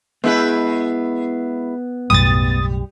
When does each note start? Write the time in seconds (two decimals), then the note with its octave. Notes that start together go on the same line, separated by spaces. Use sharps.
0.24 G#3 B3 E4 B4
2.10 B1 F#2 A2 G3 D#6 A6